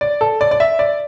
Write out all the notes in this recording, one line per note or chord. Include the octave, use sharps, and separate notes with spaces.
D5
A4
D5
D5
E5
D5